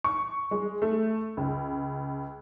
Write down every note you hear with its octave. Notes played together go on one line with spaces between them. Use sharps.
C#6
G#3
A3
C#2